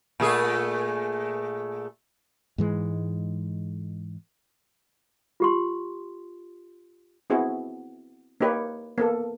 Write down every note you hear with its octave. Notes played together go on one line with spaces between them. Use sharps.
A#2 A3 G#4
G#2 E3 G#3
F4 G4 C6
B3 C4 E4 F#4 G#4
A#3 D#4 G4 B4 C#5
A#3 B3 A4